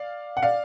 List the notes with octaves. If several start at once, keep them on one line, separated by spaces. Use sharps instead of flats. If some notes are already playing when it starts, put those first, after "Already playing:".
Already playing: D5 F5
F#5
D5 F5